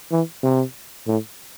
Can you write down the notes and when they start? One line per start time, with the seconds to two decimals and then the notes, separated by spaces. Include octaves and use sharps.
0.11 E3
0.43 C3
1.07 A2